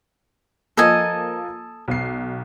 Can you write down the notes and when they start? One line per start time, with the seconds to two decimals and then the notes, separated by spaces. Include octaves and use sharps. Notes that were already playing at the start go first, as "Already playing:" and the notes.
0.77 F3 A#3 A4 D#5 G#5
1.88 B1 C7